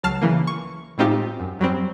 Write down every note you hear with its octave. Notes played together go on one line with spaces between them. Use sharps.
C#2 F#3 A5 F6 C7
C#3 E3 A#3
C#6
A2 G#3 C4 D#4 F4 G4
F#2
F#2 F#3 G3 C4